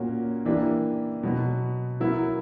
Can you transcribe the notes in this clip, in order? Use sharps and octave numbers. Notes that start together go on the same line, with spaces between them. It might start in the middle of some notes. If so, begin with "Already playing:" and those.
Already playing: A#2 A#3 C#4 F#4
E3 A#3 D4 G4
B2 F#3 B3
F#3 B3 E4 A#4